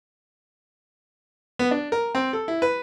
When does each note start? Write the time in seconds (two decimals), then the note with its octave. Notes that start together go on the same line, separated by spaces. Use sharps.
1.59 B3
1.71 D4
1.92 A#4
2.15 C4
2.33 A4
2.48 E4
2.62 B4